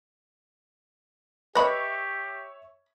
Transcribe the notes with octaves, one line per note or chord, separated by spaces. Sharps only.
G4 B4 C#5 D#5 E5 B5 C#6